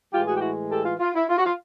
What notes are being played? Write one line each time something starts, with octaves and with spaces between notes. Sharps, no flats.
A2 E3 G#3 F4 G4
F#4 G#4
G4
E4 F#4
G4 A4
F4
F4
E4
F4
F#4
F4